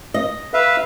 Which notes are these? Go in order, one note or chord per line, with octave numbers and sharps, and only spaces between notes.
D#5
B4 E5 F5